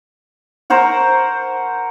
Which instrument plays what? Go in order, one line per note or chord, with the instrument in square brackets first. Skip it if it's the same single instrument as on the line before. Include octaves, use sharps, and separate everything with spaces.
[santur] A#4 C5 C#5 F#5